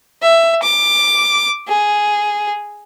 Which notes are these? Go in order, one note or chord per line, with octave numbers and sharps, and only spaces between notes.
E5
D6
G#4